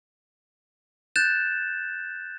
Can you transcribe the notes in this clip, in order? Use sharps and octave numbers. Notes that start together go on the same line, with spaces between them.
F#6 G6 A6 E7